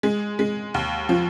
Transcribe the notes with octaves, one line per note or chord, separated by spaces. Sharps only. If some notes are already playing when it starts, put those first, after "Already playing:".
G#3
G#3
D#2
F3